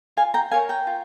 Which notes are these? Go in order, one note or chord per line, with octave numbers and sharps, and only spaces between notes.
F4 F5 G#5
G5 A#5
A#4 C#5 F5 G#5
G5 A#5
F4